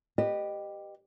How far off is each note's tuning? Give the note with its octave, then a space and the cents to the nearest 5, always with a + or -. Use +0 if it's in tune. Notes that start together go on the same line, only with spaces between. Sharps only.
G4 +0 B4 -5 D#5 -25